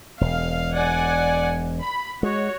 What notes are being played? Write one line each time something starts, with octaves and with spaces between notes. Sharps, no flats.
E1 F5
D5 F#5 G#5
B5
G#3 F#4 C#5